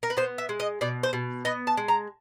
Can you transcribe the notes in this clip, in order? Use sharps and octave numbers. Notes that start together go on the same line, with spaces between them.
A#4
B4
B3 C5
E5
G#3
D#5
B2 D5
C5
B2
B3 D#5
A5
G#3
A#5